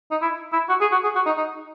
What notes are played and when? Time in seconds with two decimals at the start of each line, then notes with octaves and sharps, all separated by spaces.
0.11 D#4
0.22 E4
0.53 E4
0.69 F#4
0.81 G#4
0.92 F#4
1.03 G#4
1.15 F#4
1.26 D#4
1.38 D#4